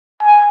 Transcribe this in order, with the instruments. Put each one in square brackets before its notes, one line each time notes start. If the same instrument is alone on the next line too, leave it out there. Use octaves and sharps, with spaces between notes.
[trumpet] G#5